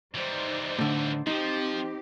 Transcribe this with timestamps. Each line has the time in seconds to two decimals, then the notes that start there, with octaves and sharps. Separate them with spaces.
0.15 E3 G3 D#4 C5 D5
0.79 A2 D3
1.27 F3 C4 D#4 G4